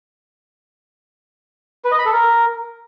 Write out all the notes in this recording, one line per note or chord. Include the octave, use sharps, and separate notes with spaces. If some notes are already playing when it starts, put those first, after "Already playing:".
B4
D#5
B5
A4
A#4